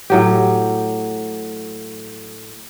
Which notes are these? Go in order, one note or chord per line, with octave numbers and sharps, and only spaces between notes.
A2 F#3 G4